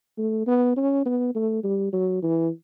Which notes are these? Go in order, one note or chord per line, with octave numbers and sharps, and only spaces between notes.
A3
B3
C#4
B3
A3
G3
F#3
E3